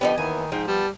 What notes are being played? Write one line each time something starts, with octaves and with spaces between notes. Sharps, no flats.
D3 F3 B3 C#4 D#4 G4
D#2 D#3 E3 B3 G#5
G#2 F3 D#4 G5
G3 B3 A5